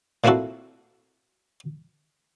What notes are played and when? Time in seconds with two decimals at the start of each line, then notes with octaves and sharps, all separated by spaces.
0.24 A#2 A#3 C4 E4 F#4 A4